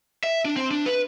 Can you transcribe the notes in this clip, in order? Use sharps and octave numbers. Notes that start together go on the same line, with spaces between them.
E5
D4
C4
D4
B4